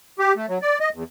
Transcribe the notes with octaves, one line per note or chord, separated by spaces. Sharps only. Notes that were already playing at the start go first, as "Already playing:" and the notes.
G4
A3
F#3
D5
D#5
E2